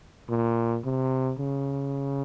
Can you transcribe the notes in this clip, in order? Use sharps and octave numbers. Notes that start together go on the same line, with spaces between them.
A#2
C3
C#3